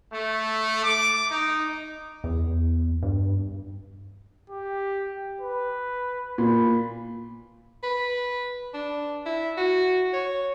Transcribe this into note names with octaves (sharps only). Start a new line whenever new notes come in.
A3
D6
D#4
E2
G2
G4
B4
A#2 B5
B4
D4
E4
F#4
C#5